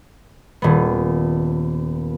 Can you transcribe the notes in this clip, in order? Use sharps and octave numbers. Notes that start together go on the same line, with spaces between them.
D#1 B3